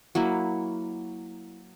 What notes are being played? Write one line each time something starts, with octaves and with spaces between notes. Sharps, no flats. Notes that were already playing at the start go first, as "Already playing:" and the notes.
F#3 A#3 E4